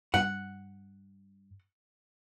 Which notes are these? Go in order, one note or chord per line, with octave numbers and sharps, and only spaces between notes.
G2 F#5